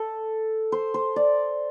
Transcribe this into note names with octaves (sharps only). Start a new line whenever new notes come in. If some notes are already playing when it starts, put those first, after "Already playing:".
Already playing: A4
C5
C5
D5